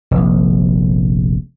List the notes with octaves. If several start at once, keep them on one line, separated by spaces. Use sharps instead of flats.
F1 A#1